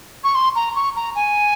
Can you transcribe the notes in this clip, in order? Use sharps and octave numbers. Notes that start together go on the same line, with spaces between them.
C#6
C6
A#5
C#6
A#5
G#5